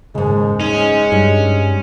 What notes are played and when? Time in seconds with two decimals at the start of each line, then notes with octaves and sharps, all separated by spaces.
0.15 D#2 G#2 C#3 G#3
0.60 G#3 C#4 D#4
1.12 G2 G3